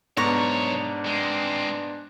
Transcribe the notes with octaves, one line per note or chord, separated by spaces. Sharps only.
B1 G#2 B3 D4 C#5 A#5 C#6
G#3 C4